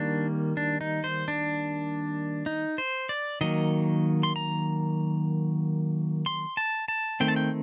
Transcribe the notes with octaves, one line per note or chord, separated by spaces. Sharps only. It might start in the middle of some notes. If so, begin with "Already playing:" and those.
Already playing: D#3 G3 A#3 D4
D4
D#4
C5
D4
D#4
C5
D5
D#3 F#3 A#3 D#5
C6
A#5
C6
A5
A5
D#3 A3 C4 G5
A5
G5